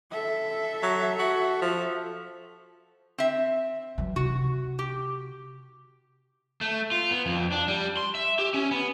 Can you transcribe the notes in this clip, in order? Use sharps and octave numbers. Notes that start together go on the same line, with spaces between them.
A4 E5
F#3
F#4
F3
C4 E5
E3 F#3
C3 F#4
G4
A3
F4
B3
F2
D4
G3
C6
E5
G4
C#4
B3